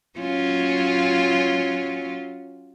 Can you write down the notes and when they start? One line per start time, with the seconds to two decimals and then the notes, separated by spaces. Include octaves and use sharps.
0.20 F#3 C#4 F4